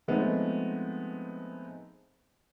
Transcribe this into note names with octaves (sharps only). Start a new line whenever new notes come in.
F3 G#3 A3 B3 C4 D#4